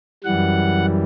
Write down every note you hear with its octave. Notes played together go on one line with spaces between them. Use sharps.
F#2 E3 G3 F#5